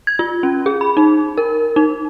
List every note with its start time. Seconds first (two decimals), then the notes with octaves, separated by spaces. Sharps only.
0.07 G#6
0.19 F4
0.43 C#4
0.66 G#4
0.81 B5
0.97 D#4
1.37 A#4
1.76 D#4